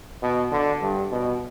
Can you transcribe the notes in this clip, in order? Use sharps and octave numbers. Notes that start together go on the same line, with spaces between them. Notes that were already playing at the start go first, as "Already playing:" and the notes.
B2
D3
G2
B2